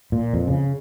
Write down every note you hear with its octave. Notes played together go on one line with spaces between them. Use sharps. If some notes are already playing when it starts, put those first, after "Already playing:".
A#2
F2
C#3